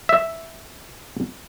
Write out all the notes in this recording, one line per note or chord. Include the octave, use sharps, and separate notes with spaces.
E5